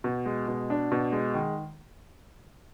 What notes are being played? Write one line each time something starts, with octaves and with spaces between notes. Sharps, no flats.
B2
G#3
B2
D4
B2
G#3
D#3